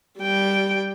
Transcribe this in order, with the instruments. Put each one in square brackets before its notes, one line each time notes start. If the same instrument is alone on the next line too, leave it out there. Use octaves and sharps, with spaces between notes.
[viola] G3 G5